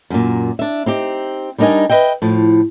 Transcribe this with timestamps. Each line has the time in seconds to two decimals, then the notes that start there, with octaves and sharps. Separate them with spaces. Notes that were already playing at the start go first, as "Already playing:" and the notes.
0.10 F#2 A#2
0.59 D4 E5
0.86 C4 D#4 G4
1.58 G3 D4 D#4 A#4 D#5 G#5
1.90 B4 C5 D#5 E5 G5
2.22 A2 F3